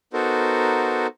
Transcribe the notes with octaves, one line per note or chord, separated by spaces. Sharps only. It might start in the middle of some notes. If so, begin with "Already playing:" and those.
B3 D#4 F#4 A4 A#4 C5